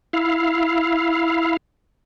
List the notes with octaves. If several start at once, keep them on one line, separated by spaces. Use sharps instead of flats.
E4 F5